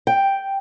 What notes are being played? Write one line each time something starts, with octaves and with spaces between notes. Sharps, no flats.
G5